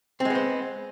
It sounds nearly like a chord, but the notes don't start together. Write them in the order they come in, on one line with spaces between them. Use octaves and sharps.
C4 G#3 B3 C5